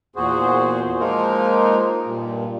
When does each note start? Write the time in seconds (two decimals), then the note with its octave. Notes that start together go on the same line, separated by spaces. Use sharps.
0.16 E2 A#2 F#4 G#4 C5
1.00 F3 G#3 A#3 D#4 F4 A#4
2.05 G2 A#2